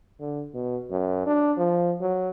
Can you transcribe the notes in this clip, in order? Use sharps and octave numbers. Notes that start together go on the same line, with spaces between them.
D3
B2
F#2
D4
F3
F#3